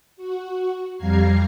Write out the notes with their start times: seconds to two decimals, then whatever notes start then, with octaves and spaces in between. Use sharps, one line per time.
0.17 F#4
0.97 F2 G3 F5 A#5 G#6 C7